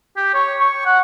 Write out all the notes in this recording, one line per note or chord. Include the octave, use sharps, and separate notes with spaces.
G4
C#5
C#6
F#5